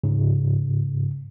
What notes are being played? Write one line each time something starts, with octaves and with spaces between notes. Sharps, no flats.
G#2 C#3